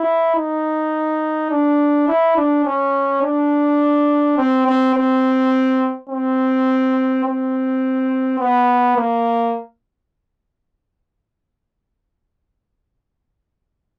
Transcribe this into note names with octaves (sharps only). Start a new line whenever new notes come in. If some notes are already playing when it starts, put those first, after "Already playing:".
Already playing: E4
D#4
D4
E4
D4
C#4
D4
C4
C4
C4
C4
C4
B3
A#3